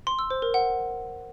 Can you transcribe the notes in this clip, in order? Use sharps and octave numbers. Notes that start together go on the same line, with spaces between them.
C6
E6
C5
A#4
F#5